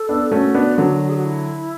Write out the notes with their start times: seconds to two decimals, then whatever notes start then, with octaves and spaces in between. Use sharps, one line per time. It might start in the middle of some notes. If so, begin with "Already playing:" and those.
Already playing: A4
0.09 B3 D4
0.31 A3 C#4 F#4
0.55 B3 D4
0.78 D3 F#3
1.09 G#4
1.17 F#4
1.25 E4